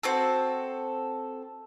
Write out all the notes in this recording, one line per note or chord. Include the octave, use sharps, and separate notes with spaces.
C4 F#4 A4